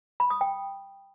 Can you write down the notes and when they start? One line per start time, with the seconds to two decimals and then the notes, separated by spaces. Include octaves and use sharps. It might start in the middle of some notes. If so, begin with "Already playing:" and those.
0.20 B5
0.30 D#6
0.41 G5